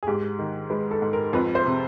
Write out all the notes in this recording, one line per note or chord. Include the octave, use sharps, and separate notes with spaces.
G#4
G#2 G4
D#3
G#3 B4
A4
G#2
A#4
F2 B4
C5
C3